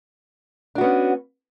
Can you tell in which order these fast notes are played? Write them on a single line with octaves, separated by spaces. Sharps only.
D4 F#4 B3 C#4